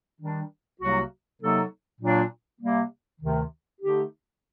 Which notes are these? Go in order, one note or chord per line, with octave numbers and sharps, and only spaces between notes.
D#3 G3 D4
C2 C3 F#3 A#3 F#4
C3 F#3 A#3 D#4 A4
A#2 F#3 A#3 D4
C3 G3 A#3
D2 C3 D#3
D3 A3 D#4 G4